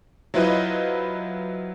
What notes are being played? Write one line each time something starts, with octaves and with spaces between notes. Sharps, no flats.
F#3 E4 F4 B4 C5 D#5